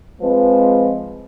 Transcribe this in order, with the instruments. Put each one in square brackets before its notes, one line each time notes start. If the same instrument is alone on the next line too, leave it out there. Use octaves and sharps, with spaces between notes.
[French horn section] F3 G#3 C4 B4